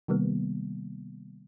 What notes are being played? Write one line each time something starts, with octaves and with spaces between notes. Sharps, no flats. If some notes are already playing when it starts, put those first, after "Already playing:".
C3 D#3 G3 A#3 B3